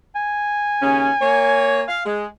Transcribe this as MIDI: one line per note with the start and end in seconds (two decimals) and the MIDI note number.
0.15 2.10 80
0.82 1.10 39
0.82 1.10 49
0.82 1.10 61
1.21 1.81 58
1.21 1.81 73
1.88 2.03 77
2.06 2.26 56